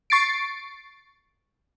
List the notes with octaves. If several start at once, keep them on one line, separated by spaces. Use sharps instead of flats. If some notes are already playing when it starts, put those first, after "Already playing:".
C#6 A6 C7 D7